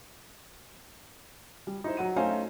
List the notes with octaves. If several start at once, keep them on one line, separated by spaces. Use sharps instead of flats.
G3
D#4 E4 C5
F#3 F#5 D#7
A3 C#4 D#4 C5 F5 G#5